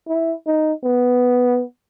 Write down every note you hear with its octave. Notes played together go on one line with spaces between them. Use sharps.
E4
D#4
B3